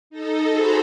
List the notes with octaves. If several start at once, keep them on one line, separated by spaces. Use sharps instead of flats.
D#4 A4 D#5
F#4 G#4 A4 C5 A#5 B5